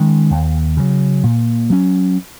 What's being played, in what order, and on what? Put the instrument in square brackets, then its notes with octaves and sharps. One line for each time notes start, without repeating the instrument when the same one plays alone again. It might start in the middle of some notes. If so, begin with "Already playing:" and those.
Already playing: [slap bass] D#3 G#3 C#4
D#2
C#3 F#3
A#2
F#3 C#4